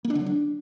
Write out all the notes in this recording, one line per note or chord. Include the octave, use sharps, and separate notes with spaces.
A#3
D4
D3
F#3
D4